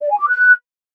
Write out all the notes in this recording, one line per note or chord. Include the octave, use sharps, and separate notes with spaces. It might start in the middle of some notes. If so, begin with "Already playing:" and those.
D5
G#5
D6
F#6